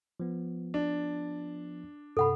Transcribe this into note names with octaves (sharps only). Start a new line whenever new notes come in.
F3 B3
D4
G2 C3 A4 F#5 B5